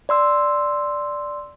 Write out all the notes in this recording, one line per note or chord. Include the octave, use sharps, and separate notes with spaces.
D5 C6 E6